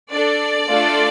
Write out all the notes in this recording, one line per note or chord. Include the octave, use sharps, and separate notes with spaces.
D4 A4 D5
A3 D4 F4 A4